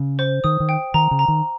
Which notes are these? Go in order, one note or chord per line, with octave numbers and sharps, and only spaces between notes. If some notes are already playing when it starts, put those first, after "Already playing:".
Already playing: C#3
C5
D#3 D#6
D#3
G5
D#3 A#5
C#3
A#5
D#3